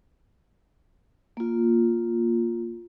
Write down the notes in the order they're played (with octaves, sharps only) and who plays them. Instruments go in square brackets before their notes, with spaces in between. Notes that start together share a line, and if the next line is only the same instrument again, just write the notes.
[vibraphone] A#3 F4